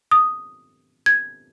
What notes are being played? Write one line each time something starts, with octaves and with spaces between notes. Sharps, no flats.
D#6
G#6